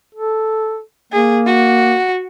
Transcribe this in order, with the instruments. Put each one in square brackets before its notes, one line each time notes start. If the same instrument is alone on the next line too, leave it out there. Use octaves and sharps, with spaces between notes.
[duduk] A4
[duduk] A#3 [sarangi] G#4
[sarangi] F#4